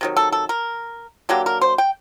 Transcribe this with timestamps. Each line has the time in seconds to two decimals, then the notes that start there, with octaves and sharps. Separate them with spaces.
0.01 C3 D#3 F#3
0.17 A4
0.32 A4
0.49 A#4
1.29 D3 F#3 A#3 G4
1.46 A#4
1.61 C5
1.78 G5